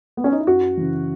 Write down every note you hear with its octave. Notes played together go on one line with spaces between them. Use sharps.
B3
C#4
D#4
E4
F#2 F#4
C#3 E3